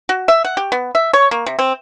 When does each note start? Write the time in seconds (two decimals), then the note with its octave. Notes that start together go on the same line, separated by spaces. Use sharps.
0.09 F#4
0.28 E5
0.45 F#5
0.57 G4
0.72 B3
0.95 E5
1.13 C#5
1.31 A#3
1.46 C3
1.59 C4